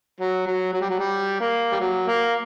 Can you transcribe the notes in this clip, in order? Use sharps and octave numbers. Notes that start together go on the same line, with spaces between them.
F#3
F#3
F#3
G3
F#3
G3
A#3
G3
F#3
A#3